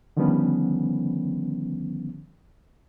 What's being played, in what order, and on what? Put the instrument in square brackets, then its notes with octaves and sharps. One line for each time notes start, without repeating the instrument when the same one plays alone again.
[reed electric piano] D3 D#3 F3 G3 B3 C#4